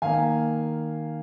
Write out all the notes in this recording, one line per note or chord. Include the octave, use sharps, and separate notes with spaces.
D#3 A#3 F5 G#5